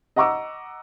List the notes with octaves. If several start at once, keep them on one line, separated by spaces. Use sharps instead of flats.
D#5 F#5 A#5 C#6 D6 E6